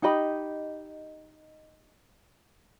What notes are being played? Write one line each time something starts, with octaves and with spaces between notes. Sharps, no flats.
D#4 G4 D#5 B5